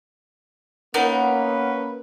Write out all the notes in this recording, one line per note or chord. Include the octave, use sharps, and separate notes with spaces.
A#3 B3 C#4 D#4 A#4 B4